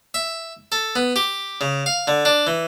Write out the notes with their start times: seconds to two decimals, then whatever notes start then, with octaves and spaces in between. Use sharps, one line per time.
0.14 E5
0.72 A4
0.96 B3
1.16 G4
1.61 C#3
1.86 F5
2.08 D3
2.25 D4
2.47 E3